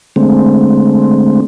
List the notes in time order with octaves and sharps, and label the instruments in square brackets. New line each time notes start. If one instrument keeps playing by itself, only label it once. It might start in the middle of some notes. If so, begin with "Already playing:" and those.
[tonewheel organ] D3 G#3 A3 C4